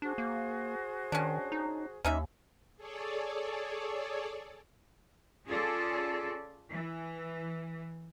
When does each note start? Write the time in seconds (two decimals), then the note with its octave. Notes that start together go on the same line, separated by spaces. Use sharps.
0.02 D4 F#4 G#4 C5
0.18 A#3
1.12 D#3 C#4 D4
1.52 D#4
2.05 D#2 C#4 D#4 E5
2.76 G#4 A4 C#5 D5
5.47 C#4 F4 G#4 A4 D5
6.72 E3